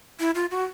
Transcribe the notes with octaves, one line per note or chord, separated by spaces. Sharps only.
E4
F4
F#4